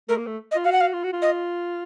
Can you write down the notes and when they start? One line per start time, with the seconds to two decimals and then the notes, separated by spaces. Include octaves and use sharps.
0.09 A3 A#4
0.18 A#3
0.27 A3
0.51 D#5
0.56 F4
0.65 F#4 F5
0.72 F#5
0.81 F5
0.93 F4
1.04 F#4
1.13 F4
1.22 D#5